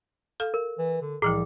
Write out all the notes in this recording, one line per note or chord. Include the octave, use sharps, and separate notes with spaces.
A4 F5 F6
A#4
E3
D3
C2 A2 E3 F3 G#4 G5